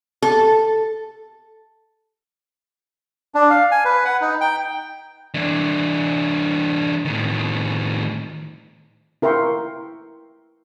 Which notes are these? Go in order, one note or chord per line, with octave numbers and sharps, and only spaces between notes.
A4
D4
F5
G#5
B4
F#5
D#4
G5
E3 D4
A2 D#3
E4 A#4 E5 G5 C6 C#6